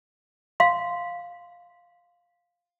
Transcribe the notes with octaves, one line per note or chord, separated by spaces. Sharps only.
F5 C6